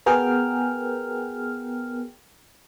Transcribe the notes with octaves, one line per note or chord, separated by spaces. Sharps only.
B3 F#4 G#4 A#4 G5 F6